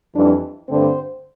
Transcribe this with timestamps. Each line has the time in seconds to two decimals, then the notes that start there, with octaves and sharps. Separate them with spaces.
0.14 F2 E3 G3 D4
0.68 G2 D3 A3 C4 C5